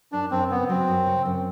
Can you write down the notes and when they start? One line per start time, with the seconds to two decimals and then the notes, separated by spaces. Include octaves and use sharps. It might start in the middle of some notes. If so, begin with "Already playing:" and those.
0.12 F#2 D4
0.31 F#2 C4
0.50 C#3 B3
0.69 F#3 C4
0.88 F#2
1.07 C#3
1.25 F#2